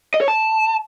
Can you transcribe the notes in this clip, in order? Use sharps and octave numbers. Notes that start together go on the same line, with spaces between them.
D#5
C#5
A5